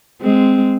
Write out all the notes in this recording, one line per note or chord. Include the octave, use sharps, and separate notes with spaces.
G#3 C4